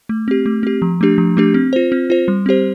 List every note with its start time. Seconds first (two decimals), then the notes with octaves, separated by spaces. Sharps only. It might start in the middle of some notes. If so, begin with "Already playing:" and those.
0.09 A3
0.28 C4 G4
0.46 A3
0.63 C4 G4
0.82 F3
1.01 A3 D4 G4
1.18 F3
1.37 A3 D4 G4
1.54 C4
1.73 F4 C5
1.92 C4
2.10 F4 C5
2.28 G3
2.46 C4 G4 C5